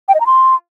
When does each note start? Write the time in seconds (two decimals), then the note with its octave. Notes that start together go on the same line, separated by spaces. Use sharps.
0.09 G5
0.14 D#5
0.20 A#5
0.26 C6